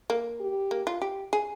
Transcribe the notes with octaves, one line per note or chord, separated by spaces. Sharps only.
A#3
G4
A#3
F4
G4
G#4